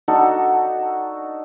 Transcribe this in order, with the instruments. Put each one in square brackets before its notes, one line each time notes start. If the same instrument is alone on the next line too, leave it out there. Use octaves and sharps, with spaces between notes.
[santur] D4 D#4 F#4 A4